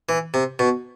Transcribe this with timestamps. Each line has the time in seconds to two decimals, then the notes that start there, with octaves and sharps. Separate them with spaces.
0.09 E3
0.34 C3
0.59 B2